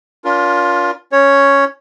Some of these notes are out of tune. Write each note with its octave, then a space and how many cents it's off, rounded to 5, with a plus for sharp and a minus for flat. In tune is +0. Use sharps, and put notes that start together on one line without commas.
D4 -45 F4 +10 A#4 +25
C#4 +0 C#5 +0